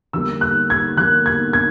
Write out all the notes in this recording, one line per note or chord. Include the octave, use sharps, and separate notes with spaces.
D3 G3 A#3 E6
F#6
G#6
D3 G3 A#3 F#6
G#6
G#6